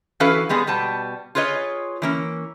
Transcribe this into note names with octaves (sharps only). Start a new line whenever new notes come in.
E3 C#4 F#4 A4 B4 F5
G3 G#3 B3 G#4
B2 G3 B3 A5
F4 G#4 B4 C#5 D#5
E3 A#3 C#4